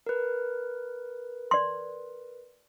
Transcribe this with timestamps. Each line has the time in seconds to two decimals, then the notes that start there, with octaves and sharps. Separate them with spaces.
0.07 A#4 B4
1.51 D5 C6